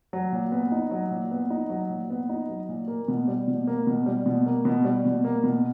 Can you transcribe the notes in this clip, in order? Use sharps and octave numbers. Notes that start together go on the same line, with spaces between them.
F#3
A#2
B3
D#4
F#3
A#2
B3
D#4
F#3
A#2
B3
D#4
F#3
A#2
A#3
B2
G3
B2
A#3
B2
G3
B2
A#3
B2
G3
B2
A#3
B2